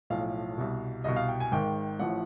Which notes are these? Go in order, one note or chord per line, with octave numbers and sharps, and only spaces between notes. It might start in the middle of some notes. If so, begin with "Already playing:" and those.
B1 A2 F3 F5
C2 B2
C2 B2 D#5
F5
G5
G#5
G#1 G#2 D#3 G5
A1 A2 F3 F#5